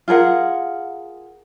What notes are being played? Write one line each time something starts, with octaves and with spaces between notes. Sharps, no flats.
F4 G#4 A#4 F#5